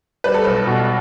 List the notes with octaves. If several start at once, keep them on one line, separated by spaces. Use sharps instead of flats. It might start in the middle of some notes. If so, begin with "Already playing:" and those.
G3 B4
A4
B1 B4
B2